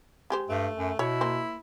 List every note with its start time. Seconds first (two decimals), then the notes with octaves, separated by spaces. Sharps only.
0.30 G#3 G4 C5
0.49 G2 A3
0.77 F#2
0.99 B2 E4 C#5
1.21 A#3 C5